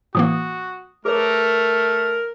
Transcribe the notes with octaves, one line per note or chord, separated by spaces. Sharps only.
A2 E3 A#3 F#4 D#6
A3 G#4 A#4 B4 C#5